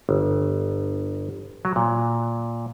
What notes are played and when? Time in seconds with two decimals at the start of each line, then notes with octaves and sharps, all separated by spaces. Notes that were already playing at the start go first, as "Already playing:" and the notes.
0.09 G1
1.65 F#3
1.76 A#2